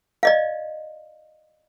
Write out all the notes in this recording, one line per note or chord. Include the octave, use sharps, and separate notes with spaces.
D5 D#5 F5